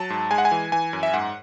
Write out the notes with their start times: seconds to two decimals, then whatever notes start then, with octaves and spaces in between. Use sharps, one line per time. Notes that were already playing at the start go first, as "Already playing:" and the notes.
Already playing: F#3 A5
0.10 G#2
0.31 G#3 G#5
0.38 F#5
0.45 G#5
0.51 E3
0.72 E3 G#5
0.93 F#2
1.03 E5
1.13 G#2 F#5